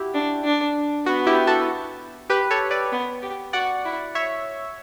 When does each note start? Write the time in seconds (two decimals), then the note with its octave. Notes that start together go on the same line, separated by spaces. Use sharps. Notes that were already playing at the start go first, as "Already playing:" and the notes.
Already playing: E4 F#4 G4
0.14 D4
0.44 D4
1.06 B3 F#4
1.27 E4 G4
1.47 F#4 A4
2.30 G4 B4
2.50 A4 C#5
2.71 B4 D5
2.92 B3
3.22 G4
3.53 F#4 D5 F#5
3.85 E4
4.15 C#5 E5